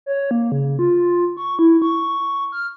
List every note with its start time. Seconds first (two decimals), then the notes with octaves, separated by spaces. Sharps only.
0.06 C#5
0.31 A#3
0.52 C#3
0.79 F4
1.37 C#6
1.59 E4
1.82 C#6
2.52 F6